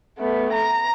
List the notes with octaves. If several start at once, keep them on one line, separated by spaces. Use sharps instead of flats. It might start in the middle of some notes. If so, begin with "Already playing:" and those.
A3 B3
A#5